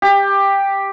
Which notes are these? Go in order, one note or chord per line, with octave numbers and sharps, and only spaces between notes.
G4